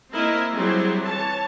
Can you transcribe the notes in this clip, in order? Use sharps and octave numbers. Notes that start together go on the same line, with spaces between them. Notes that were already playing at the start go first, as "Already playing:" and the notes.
A#3 C4 E4 A#4 D#5
F#3 G3 C4 E4 G#4
E3 C#5 A5